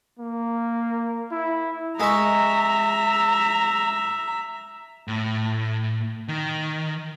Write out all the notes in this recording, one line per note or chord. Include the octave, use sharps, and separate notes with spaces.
A#3
E4
G#3 E5 A#5 C#6
A2
D#3